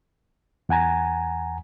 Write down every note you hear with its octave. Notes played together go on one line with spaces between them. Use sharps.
E2 F#5 G#5 A#5